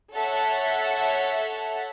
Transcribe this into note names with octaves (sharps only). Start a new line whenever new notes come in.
A4 C#5 E5 F#5